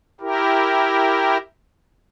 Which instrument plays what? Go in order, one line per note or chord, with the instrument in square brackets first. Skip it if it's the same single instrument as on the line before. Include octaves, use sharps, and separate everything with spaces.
[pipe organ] E4 G4 A#4